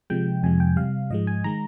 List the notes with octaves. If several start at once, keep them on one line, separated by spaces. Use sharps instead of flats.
C3 F3 G#3 G5
F2 C3 F3 G#3 G#5
G5
C3 G3 F5
G#2 F3 G#3 D#5
G#5
D#3 G#3 A#5